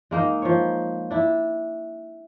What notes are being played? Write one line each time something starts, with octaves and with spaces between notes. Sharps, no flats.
G#3 A#3 D#4
F3 C#5
D4 E4